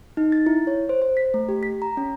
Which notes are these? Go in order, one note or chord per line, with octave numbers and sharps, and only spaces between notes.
D#4
A6
E4
C#5
C5
C5
B6
A3
G4
B6
A#5
C#4